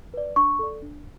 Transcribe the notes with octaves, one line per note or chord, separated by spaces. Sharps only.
B4 D5
D4 C#6
A4 D5
D4